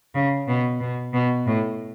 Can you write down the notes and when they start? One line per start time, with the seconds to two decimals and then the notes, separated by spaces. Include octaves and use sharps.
0.15 C#3
0.48 B2
0.81 B2
1.13 B2
1.46 A2